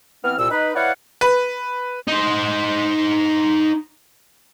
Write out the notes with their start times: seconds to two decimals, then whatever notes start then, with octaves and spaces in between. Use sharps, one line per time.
0.24 E3 B3 C4 F6
0.38 C2 A#2 E6
0.50 D#4 B4
0.75 E4 B4 C#5 D5 F5 F#5
1.21 B4
2.08 D#4 C5